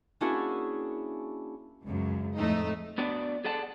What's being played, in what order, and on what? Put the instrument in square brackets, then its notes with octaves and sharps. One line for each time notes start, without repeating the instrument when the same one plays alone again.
[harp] A#3 C#4 D4 E4 F#4 G#4
[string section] C#2 F#2
F2 A2 A3 D#4
[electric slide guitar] B3 D4 F#4 D5
G#4 A4 D5 F#5 A5